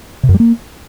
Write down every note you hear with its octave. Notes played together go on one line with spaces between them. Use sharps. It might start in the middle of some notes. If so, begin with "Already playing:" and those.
C3
F#2
G3
A#3